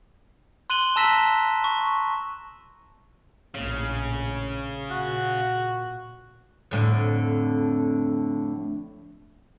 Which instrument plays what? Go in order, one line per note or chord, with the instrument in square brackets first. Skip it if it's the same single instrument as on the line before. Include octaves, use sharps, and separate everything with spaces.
[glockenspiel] C6 F#6 D#7 F#7 G7
A5 A#5 E6 A#6 B6 E7
C#6
[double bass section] A#1 A2 [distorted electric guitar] C#3
[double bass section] A#2 [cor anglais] F#4
[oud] F2 A2 D3